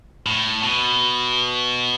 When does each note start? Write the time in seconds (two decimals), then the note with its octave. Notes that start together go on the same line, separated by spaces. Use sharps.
0.26 A2
0.63 B2